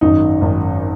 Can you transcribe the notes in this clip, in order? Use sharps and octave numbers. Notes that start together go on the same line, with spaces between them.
G#1 F#2 D#3 D#4
G#1 F#2 D#3